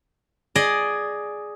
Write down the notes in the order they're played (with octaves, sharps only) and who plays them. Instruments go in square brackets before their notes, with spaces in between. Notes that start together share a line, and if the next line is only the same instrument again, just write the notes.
[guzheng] G#4 D5 D#5